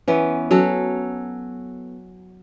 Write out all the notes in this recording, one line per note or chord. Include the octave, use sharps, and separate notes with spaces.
E3 B3 C#4
F#3 C#4 A4